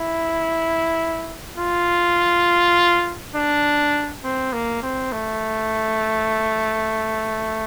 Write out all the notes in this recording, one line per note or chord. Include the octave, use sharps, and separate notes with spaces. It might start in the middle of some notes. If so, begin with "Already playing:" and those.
Already playing: E4
F4
D4
C4
A#3
C4
A3